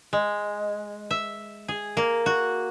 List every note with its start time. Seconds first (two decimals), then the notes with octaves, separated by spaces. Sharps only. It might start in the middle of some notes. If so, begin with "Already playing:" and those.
0.13 G#3
1.11 E5
1.68 G#4
1.97 A#3
2.26 F#4